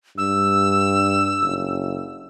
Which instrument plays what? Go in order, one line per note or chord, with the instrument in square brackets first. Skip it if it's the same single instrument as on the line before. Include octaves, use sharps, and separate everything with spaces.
[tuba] G2 [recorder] E6
[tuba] F#1